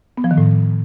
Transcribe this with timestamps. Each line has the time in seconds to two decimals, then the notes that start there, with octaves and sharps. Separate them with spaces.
0.17 B3
0.24 F3
0.31 D#3
0.38 A2